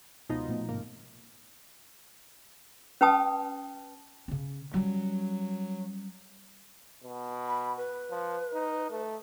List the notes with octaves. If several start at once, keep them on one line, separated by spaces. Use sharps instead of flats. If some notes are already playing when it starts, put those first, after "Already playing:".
C#2 B2 F3 D#4
A#2 A3 B3
A1 G#2 C3 A#3
C#4 B4 G5 A5 D#6
C#3 C#4
F#3 G3 C#4
B2
B5
B4
F3
D#4
A3